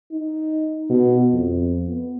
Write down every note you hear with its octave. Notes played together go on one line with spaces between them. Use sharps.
D#4
B2
F2
B3